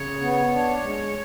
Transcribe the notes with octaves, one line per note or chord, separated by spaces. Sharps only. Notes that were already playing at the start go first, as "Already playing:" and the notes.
Already playing: C#3 C#5
B3
D4
G#3